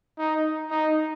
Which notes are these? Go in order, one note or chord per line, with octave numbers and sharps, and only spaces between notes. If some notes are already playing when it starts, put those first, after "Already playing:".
D#4
D#4